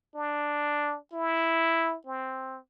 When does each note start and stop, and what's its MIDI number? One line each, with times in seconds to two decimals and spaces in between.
0.15 0.97 62
1.13 1.96 64
2.07 2.59 60